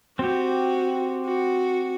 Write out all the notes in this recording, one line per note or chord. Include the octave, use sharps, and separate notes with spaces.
C4 F#4 G4
F#4